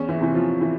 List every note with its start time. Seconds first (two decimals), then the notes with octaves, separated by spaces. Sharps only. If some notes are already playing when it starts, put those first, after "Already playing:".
Already playing: E2 C#4
0.09 E3 E4
0.21 C3 E3
0.34 F3 F4
0.60 E3 E4